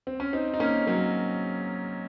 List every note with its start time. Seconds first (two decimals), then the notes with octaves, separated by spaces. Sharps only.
0.07 C4
0.20 C#4
0.33 C4 D#4
0.54 D#4
0.60 A#3 C#4
0.87 F#3 A#3